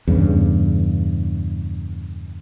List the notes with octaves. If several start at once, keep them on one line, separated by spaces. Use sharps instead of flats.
E2 G2 C#3